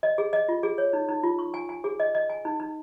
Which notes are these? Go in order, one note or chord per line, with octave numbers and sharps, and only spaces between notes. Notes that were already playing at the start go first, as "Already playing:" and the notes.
D#5
G#4
D#5
F4
G#4
C#5
D#4
D#4
F4
C#6
G#5
G#5
G#4
D#5
D#5
G#5
D#4
D#4